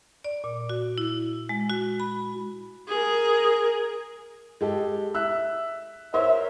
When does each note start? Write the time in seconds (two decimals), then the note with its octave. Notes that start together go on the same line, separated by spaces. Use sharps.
0.24 D5
0.44 A#2
0.69 F#4
0.98 E4
1.49 G#3
1.70 F#4
2.00 B5
2.88 G#4 A#4
4.61 G#3 G4 A4
5.14 E5 E6 F#6
6.14 A#4 C5 C#5 E5